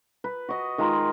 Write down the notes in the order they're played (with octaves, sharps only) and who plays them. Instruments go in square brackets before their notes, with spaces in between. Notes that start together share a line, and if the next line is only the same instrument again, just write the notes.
[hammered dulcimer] B4
F#4 D#5
D#3 G#3 F4 A#5